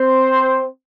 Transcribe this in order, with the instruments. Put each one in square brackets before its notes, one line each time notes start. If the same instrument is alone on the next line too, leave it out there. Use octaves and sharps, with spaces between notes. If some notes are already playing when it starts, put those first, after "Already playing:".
Already playing: [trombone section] C4 C5